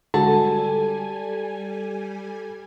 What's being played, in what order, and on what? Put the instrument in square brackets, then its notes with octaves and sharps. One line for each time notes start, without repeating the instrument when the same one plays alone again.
[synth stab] D3 G#3 F#4 [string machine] G3 G#5 [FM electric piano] A4 [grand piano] A5